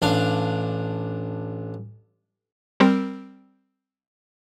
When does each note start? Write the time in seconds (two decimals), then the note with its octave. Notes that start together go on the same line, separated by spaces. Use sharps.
0.02 A1 D4 F5
2.80 G3 C4 A#4